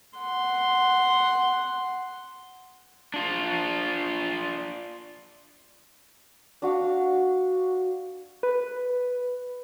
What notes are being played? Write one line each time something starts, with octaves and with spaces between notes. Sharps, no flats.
F#5 C6
D4 F4
D4 F#4 F5
B4